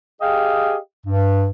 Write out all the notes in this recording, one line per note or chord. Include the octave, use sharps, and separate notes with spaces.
G4 G#4 D#5 F5 G5
G2